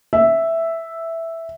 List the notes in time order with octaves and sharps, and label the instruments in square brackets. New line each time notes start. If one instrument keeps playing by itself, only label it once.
[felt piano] E5